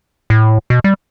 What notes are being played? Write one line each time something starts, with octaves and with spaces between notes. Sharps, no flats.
A2
B2
G3